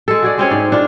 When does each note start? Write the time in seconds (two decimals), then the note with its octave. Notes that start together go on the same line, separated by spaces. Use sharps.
0.08 G#3 A4
0.22 F#4 G#4 D5
0.38 G#3 C4 C#4 G#4
0.51 G#2 D5
0.72 D4 F4